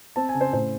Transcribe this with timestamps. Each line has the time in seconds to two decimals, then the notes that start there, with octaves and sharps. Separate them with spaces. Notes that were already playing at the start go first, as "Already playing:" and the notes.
0.16 C4 A5
0.29 G#5
0.34 C#3
0.41 C5
0.53 A2 C5